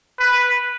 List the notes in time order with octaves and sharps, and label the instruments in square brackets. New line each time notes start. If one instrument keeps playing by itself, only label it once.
[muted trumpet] B4